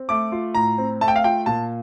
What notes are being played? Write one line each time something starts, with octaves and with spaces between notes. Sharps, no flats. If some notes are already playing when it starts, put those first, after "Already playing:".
Already playing: C4
A3 D6
F4
A2 A#5
C4
A3 A5
G5
F5
F4 G5
A#2 A5